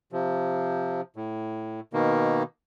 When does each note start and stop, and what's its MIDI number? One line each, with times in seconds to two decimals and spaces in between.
0.12 1.01 48
0.12 1.01 53
1.16 1.80 45
1.93 2.43 47
1.93 2.43 51
1.93 2.43 58